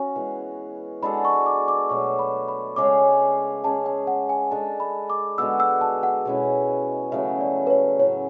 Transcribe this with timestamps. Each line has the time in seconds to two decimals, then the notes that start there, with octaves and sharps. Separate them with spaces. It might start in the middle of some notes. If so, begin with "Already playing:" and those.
Already playing: C#4 F#4
0.16 E3 G#3 B3
1.03 G#3 D4 F#4 A4 B5
1.25 C#6
1.46 D6
1.68 D6
1.89 B2 F#3 A3 C#6
2.19 B5
2.48 B5
2.76 C#3 G#3 C#4 G#4 D6
3.64 G#3 C#4 G#4 A5
3.86 G#5
4.07 F#5
4.29 G#5
4.51 G#3 D4 A4 A5
4.80 B5
5.10 D6
5.38 D3 G#3 B3 F#4 E6
5.60 E6
5.81 A5
6.03 F#5
6.25 B2 G#3 C#4 E4
7.12 C#3 F#3 A3 E5
7.41 D5
7.67 B4
7.70 C#5
7.99 A2 F#3 C#4 C#5